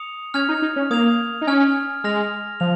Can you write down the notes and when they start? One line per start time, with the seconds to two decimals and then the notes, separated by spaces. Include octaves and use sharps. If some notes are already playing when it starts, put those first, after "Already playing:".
Already playing: D#6 C#7 F7
0.34 C#4 F6 G#6 F7
0.49 D#4
0.62 D#4
0.76 C#4
0.90 A#3 D#6 G#6 F7
1.41 D#4
1.47 C#4 G#5 F6 G#6
2.04 G#3 F6 A#6 F7
2.60 F3 F7